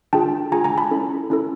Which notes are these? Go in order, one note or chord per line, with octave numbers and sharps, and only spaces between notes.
D4 F4 G#4 G5 A5
D4 F4 G#4 G#5 A#5
G#5 A#5
A5 B5
C#4 E4 A4
C#4 E4 A4